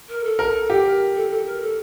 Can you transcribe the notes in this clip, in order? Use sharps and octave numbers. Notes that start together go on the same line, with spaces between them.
A#4
A4
A#4
G4
A#4
A4
A4
A#4
A4